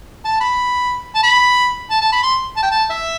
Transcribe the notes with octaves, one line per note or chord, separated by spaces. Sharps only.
A5
B5
A5
B5
A5
A5
B5
C6
A5
G5
A5
E5